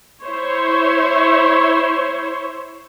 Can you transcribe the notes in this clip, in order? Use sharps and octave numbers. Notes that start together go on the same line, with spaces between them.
E4 C5 C#5